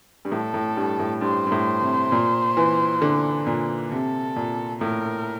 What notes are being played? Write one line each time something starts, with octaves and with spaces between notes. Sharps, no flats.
G2
A2 A4
A2
G2
A2
G2 C5
G2
A2
C3
A#2
E3
D3
A#2
C3 A4
A#2
A2 A#4